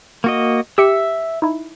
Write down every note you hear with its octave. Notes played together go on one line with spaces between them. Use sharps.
A#3 F#4 D#5
G4 E5 E6 C#7
D#4 E4